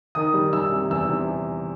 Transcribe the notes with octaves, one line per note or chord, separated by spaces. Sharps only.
D#3 D#6
G3
G3 E6
C3
E2 E6
C3